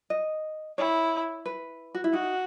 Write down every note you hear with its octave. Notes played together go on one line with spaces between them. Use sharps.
D#5
E4 C#5
B4
F#4
E4
D#4 F#4